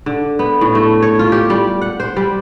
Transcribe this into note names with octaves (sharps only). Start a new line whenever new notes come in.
D3
B3
A2
A3
C#5
F4
G4
G3
F#5
C5
G3